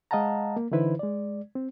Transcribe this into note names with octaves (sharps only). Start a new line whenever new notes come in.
G#3 D#5 F5 F#5 A5 A#5
A#3
D3 E3 D#4 E4 B4 C5
G#3 D5
C4